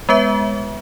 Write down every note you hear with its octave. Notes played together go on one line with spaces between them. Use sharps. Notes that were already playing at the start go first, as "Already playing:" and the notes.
G#3 B3 B4 E5